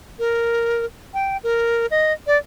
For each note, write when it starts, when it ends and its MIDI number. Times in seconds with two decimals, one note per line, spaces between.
0.19 0.85 70
1.14 1.37 79
1.44 1.86 70
1.91 2.13 75
2.27 2.37 74